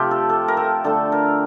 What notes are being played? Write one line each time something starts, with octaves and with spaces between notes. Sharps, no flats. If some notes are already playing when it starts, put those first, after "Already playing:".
Already playing: C3 F3 A3 F4 G4
A4
A4
A#4
A4
D3 A3 A4
A#4